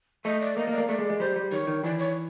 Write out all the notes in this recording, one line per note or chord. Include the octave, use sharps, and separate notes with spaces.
A3 D#5
D5
A#3 D#5
A#3
D5
A#3
A3 D5
G#3
G#3
G3 C5
G3
D#3 C#5
D#3
E3 D5
C#5